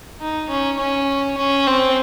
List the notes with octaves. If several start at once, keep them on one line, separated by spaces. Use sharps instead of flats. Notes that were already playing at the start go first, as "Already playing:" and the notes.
D#4
C#4
C#4
C#4
C4